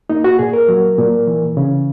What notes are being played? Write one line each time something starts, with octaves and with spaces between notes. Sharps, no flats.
A#3 D#4
F#4
A#2 G#4
A#4
F#3
A#2
E3
C#3